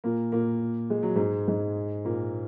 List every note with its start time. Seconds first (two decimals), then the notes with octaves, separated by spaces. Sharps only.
0.04 A#2 A#3
0.32 A#2 A#3
0.90 G#3
1.03 F#3
1.16 G#2 G#3
1.48 G#2 G#3
2.05 A#2 A#3